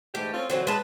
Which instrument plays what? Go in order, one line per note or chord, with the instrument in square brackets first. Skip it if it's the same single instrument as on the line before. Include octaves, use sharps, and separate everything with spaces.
[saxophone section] G#2 E3 G4 [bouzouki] A3
[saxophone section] C4 C#4 F4
[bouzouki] D3 E3 F#3 [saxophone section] C4
[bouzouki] G#3 A5 [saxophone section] B4